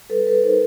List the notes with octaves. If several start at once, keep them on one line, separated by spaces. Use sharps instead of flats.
G3 A4 B4
A4 B4
D#4 A#4 C5